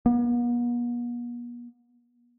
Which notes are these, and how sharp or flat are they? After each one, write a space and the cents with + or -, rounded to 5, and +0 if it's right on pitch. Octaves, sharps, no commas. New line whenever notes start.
B3 -45